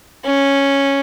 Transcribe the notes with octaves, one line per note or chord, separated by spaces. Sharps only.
C#4